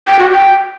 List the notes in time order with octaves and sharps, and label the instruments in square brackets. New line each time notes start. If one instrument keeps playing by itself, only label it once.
[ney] G5
F#4
G5